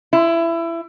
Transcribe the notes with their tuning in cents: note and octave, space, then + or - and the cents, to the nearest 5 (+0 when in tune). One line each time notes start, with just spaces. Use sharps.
E4 +20